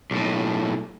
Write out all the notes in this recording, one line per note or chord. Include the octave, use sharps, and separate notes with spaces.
B1 A2